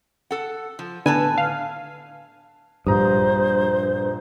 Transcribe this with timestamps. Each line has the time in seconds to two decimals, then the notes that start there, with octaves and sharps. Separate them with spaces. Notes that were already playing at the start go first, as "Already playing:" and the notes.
0.31 A4 F#5
0.79 F3
1.06 A2 D3 B3 B4 G#5 A5
1.38 F5
2.87 A#1 G2 C5 A#5 D#6